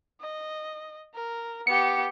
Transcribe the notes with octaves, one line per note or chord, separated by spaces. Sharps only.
D#5
A#4
B3 G4 C#7